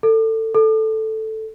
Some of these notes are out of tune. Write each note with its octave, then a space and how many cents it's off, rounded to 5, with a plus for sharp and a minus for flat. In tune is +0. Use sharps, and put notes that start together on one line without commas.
A4 +20
A4 +0